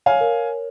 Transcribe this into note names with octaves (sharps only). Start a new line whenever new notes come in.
C#5 F5 G#5
A#4